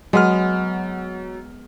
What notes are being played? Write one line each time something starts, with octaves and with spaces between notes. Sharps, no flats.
F#3 G#3 B3 F6